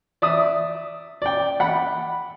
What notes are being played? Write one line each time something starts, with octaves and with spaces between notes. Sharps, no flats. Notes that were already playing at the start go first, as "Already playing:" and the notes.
D5 E5 D#6
D5 G5
F#5 B5